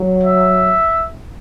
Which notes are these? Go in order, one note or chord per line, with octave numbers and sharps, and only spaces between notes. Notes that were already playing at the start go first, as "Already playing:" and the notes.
Already playing: F#3
E5